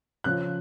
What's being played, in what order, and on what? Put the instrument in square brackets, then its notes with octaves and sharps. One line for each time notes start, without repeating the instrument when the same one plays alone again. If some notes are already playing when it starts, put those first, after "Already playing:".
[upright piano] C#3 F3 F#6